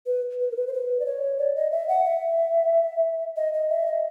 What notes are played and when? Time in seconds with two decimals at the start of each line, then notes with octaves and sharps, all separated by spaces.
0.06 B4
0.40 B4
0.51 A#4
0.56 B4
0.67 C5
0.73 B4
1.00 D5
1.06 C#5
1.38 D5
1.55 D#5
1.72 E5
1.89 F#5
2.05 E5
3.36 D#5
3.54 D#5
3.70 E5
3.86 D#5